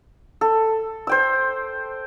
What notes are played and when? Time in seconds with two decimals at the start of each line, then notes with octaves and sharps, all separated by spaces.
0.41 A4
1.07 C5 G5 E6